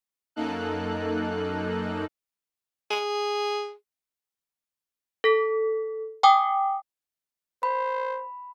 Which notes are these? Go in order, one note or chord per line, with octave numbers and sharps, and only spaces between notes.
F#2 A#3 D#4 A4 F#6
G#4
A4 B6
G5 G#5 D6 D#6
C5 B5